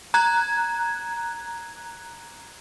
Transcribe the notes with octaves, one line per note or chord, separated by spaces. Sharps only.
A#5 F#6 G#6